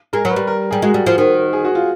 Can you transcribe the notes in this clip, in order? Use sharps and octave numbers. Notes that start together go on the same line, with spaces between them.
G#3 A#4
F#3
B4
G3
A#4
G3 G#4
G#3 F#4
G3
F3
D#3
G#4
F#4
F4